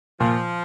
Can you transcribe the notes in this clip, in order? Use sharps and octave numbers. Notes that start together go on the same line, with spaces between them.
A#2 F3